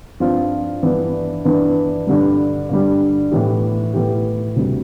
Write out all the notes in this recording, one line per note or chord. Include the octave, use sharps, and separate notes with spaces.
G2 F3 C4 F4
G2 E3 B3 D4
G2 E3 B3 D4
G2 D3 G3
G2 D3 G3
A2 E3 B3 E4 G4
A2 E3 B3 E4 G4
D2 C3 G3